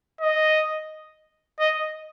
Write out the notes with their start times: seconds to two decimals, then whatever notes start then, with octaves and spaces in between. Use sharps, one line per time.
0.21 D#5
1.60 D#5